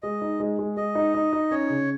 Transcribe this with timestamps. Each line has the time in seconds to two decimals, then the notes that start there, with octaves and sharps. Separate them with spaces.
0.03 G#3 D#5
0.21 D#4
0.40 G#3
0.59 G#3
0.77 G#3 D#5
0.95 D#4
1.14 D#4
1.33 D#4
1.51 C#4 C#5
1.70 C#3